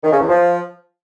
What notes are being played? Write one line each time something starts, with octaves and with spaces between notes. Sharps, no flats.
D#3
C#3
E2
F3